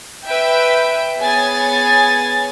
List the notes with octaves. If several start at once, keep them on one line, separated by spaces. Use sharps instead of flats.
B4 E5 G5 D7
B3 G#4 C#5 G#5 A6